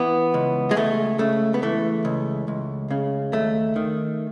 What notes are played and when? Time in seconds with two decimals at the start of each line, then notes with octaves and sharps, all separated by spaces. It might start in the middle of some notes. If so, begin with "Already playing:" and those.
Already playing: E3 B3
0.34 C#2
0.71 G#3
0.76 C#2 A3
1.19 C#3 A3
1.54 B3
1.62 E3 A3
2.05 C#2
2.48 C#2
2.91 C#3
3.33 D#2 A3
3.76 D#3